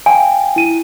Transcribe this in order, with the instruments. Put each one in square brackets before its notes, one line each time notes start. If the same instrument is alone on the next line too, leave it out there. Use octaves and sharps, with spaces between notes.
[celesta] F5 G5 [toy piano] G#5
[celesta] E4 D#7